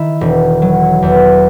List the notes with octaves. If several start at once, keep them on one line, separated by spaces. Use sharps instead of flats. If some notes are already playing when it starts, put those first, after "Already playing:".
Already playing: D#3 E4
E1
F#3
E2